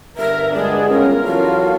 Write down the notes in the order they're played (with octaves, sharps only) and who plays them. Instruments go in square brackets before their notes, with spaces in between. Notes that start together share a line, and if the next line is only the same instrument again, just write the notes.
[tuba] G1 [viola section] A#4 [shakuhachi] E5
[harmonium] G3 G#3 B3 [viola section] D4 [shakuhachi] G#4
[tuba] C#4 [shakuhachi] F4 [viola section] A#4
[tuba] E2 [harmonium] F#3 F#4 A4 [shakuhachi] F4